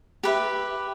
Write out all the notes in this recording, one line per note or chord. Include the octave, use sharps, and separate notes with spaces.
G4 B4 E5